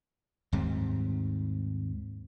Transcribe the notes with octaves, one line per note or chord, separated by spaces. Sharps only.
D#2 G#2 G3 C4